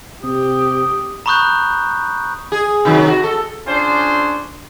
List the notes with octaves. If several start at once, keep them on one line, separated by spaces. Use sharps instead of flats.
C3 G4 D#6
A#5 B5 C#6 D#6 F#6 G6
G#4
C3 D#3 F#3
F#4
A4
C#4 D4 F4 G#4 C5